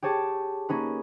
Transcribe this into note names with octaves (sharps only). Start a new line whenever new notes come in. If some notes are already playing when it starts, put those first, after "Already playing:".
G4 G#4 C#5 A5
A#3 C#4 D#4 B4